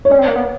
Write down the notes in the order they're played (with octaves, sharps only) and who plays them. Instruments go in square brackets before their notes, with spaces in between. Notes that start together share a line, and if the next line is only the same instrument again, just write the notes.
[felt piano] C#5
[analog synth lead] C#4 [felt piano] D5
[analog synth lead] C4
A#3
B3